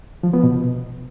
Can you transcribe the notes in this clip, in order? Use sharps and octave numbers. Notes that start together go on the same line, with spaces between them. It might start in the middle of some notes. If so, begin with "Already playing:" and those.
F3
B3
B2